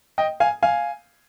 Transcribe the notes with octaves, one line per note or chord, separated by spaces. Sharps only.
D#5 G5
F5 G#5
F5 G#5